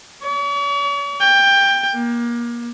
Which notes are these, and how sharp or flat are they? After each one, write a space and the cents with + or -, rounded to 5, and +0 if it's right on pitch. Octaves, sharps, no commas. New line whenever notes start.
C#5 +40
G5 +15
A#3 +30